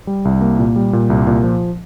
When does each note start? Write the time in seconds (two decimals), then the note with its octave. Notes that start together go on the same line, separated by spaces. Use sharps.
0.07 G3
0.25 C2
0.41 A#3
0.59 A#2
0.76 G3
0.93 A#2
1.10 C2
1.27 A#2
1.43 F3